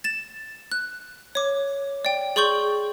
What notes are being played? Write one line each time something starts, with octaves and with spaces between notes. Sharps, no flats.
A6 E7
F#6
C#5 D6
D5 G5
G#4 D5 C6 C#6 G6 F#7